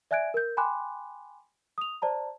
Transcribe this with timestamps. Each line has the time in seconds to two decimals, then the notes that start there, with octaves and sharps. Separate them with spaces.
0.11 D5 E5 G#5 F#6 G#6 D7
0.34 A#4 G6
0.57 G5 G#5 B5 C6 D6 F#6
1.78 D#6 F7
2.02 C5 D5 A5 A#5